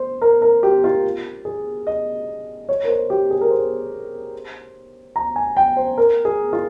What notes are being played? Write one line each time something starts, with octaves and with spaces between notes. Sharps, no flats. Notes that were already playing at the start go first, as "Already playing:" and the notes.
Already playing: C5
A#4
A#4
G4
F4
G#4
D#5
C#5
A#4
C5
G4
G#4
A#4
C5
A#5
G#5
G5
C5
A#4
G#4
F4